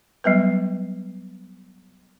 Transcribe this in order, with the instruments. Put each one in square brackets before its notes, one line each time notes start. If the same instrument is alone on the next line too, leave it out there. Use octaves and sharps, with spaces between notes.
[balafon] F#3 G3 B3 B4